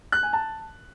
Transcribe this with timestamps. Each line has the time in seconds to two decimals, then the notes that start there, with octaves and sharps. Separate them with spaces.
0.12 F#6
0.23 G#5
0.33 A5